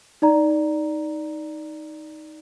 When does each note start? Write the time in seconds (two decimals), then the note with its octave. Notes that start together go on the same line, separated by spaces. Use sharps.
0.22 D#4 D5 A#5